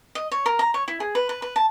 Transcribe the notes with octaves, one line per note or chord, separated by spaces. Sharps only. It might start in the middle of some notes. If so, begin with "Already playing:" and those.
D#5
C#5
A#4
A#5
C#5
E4
G#4
B4
B4
B4
A5